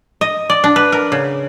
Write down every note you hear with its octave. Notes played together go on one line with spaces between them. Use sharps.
D#5
D5
D4
B4
A#4
C#3